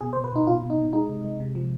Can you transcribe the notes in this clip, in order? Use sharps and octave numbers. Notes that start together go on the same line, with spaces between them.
B2 G#4
C5
B2
B4
B2 D#4
B2 F4
B2
D#4
B2
G#3 D#4
C3
G#3
C3
F3